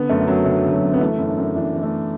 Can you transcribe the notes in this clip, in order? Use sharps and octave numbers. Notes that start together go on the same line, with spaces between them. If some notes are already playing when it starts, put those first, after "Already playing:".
Already playing: D3 B3
F#2 A3
F#2 F#3
D3 A3
D3
F#3
F#2
B3
E3 A3
F#2
D4
F#2
E3 D4
E3
A3